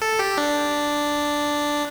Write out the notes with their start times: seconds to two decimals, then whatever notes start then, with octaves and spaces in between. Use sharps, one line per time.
0.02 A4
0.19 G4
0.37 D4